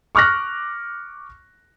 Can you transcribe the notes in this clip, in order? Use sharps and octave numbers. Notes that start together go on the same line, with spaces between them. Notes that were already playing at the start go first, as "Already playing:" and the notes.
C#6 D6 F6 F#6 A#6